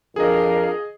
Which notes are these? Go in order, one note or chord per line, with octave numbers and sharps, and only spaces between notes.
F2 D4 G#4 A#4 D#5 F5